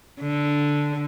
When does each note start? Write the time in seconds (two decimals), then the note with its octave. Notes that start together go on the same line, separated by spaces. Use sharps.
0.21 D3